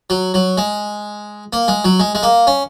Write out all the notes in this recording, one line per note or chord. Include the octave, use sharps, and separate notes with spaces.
F#3
F#3
G#3
A#3
G#3
F#3
G#3
G#3
A#3
C#4